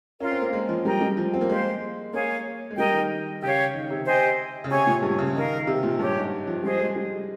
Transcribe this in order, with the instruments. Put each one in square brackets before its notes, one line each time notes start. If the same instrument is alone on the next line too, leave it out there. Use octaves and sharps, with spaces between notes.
[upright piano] C#4 [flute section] F4 A#4 F5 C6
[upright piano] C4
A#3
G#3
F3
[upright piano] G3 [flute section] A#4 D#5 G5 A#5
[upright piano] G3
F3
C4
A#3
[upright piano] G#3 [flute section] G4 C5 F5 C6
[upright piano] A#3 [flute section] G#4 C#5 F5
[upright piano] G#3
[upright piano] G3 [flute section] A#4 D#5 G5
[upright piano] D#3
[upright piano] C#3 [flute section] G4 C#5 F5
[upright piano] D#3
C3
[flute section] G4 C5 D#5 G#5
[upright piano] C#3
[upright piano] C3 [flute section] G#4 C#5 G#5 C#6
[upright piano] A#2
G2
C#3
[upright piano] D#3 [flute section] D#4 A#4 F5
[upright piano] C3
A#2
[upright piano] G2 [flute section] C#4 G4 C#5
[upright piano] G#2
F3
[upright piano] G3 [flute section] F4 G#4 C5 D#5
[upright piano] G#3
G3